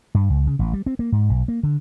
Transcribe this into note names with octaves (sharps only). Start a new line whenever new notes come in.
G2
C#2
C#3
A1
G3
C4
A#3
G#2
B1
A#3
D3